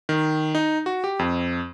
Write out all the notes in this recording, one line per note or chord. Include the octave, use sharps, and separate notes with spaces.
D#3
D#4
F#4
G4
F2